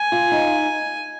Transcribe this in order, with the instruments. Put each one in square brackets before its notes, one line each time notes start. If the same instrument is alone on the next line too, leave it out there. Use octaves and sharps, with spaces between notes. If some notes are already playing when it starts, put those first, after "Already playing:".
Already playing: [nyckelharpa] G#5
[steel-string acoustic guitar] F4
D#4